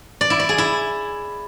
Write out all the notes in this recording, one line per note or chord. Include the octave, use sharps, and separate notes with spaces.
D5
E4
D5
G#4
E4